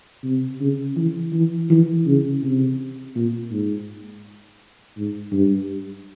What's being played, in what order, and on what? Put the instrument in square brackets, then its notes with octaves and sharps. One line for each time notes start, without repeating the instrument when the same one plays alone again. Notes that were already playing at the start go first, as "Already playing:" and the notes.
[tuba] C3
C#3
E3
E3
E3
C#3
C3
A#2
G#2
G#2
G2